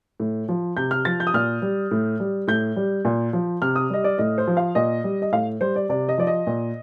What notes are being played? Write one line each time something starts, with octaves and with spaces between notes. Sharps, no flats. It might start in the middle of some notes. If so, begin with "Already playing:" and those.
A2
F3
C3 G6
F6
F3 A6
G6
D#6
A#2 F6
G3
A2
G3
A2 G6
G3
A#2
F3
C3 F6
D#6
G3 D#5
D5
A2 D#5
C5
F3
F5
A#2 D#5
G3
D#5
A2 F5
G3 C5
D5
C3 D5
D#5
F3 D5
D#5
A#2